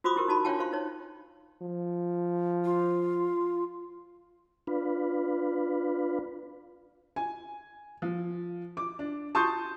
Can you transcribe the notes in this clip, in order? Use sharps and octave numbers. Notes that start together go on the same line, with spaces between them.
F4 F#4 C5 B5 D6 D#6
E4 G4 A#4
D#4 F#4 A5 B5
D4 F4 C#5 F5 G5 A5
F4 C5 F5 C6
D#4 C#5
F3
F4
D4 F4 B4
G#5
F3
D6
D4
A5 C6 C#6 D#6 G6